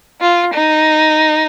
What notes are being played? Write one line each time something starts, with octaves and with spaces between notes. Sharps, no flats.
F4
D#4